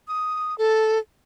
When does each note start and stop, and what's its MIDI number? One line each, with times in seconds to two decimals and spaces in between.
0.08 0.57 87
0.58 0.99 69